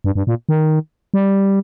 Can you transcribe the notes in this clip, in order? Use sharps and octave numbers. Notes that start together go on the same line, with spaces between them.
G2
G2
A#2
D#3
G3